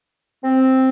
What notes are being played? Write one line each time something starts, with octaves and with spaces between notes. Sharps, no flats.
C4